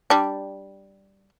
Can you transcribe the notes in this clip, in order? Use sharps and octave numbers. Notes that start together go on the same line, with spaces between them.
G3 D4